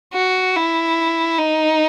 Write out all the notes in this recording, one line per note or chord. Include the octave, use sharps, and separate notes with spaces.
F#4
E4
D#4